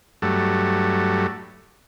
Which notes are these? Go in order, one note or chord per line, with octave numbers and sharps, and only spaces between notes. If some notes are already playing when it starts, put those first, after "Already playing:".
G2 F#3 A3